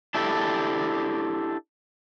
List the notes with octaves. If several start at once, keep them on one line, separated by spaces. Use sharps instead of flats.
D4 E4 G4 A4